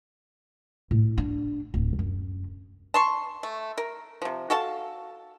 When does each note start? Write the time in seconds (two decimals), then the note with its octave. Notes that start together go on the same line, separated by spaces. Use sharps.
0.91 A2
1.18 D4
1.74 D1
1.99 F#2
2.94 A5 C6 C#6
3.43 A3
3.78 A#4
4.22 C3 F3
4.50 F#4 A4 F5 A5